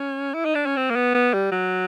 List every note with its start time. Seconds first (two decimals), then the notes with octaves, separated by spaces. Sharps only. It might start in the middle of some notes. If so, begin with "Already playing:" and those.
Already playing: C#4
0.34 E4
0.45 D#4
0.55 D4
0.66 C#4
0.77 C4
0.90 A#3
0.96 B3
1.14 B3
1.34 G3
1.52 F#3